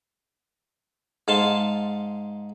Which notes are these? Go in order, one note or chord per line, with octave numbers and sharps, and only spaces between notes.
G#2 F5 A5 C6